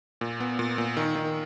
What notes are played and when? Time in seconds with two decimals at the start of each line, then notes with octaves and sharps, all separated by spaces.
0.21 A#2
0.40 B3
0.59 A#2
0.78 A#2
0.97 D#3
1.16 D#3